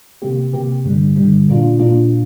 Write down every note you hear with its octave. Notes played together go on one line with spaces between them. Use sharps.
C3 A#3 G4
C3 A#3 G4
G2 D3 G3
G2 D3 G3
A#2 A#3 D4 F4
A#2 A#3 D4 F4